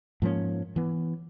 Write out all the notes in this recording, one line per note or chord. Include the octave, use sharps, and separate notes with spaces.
G#2 F3 A#3 C#4
E3 B3